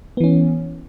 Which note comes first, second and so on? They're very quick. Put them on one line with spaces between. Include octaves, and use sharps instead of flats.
B3 E3 C#4